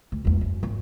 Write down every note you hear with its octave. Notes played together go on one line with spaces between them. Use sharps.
D2
E2 G#2
F#2
G#1